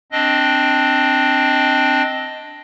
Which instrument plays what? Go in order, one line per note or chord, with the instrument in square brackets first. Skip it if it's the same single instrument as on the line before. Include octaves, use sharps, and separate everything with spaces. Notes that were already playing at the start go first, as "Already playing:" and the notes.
[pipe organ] C4 D4 D#5